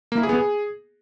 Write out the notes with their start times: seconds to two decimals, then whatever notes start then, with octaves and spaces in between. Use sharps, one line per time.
0.12 A#3
0.18 E4
0.23 G#4
0.29 B3
0.35 G#4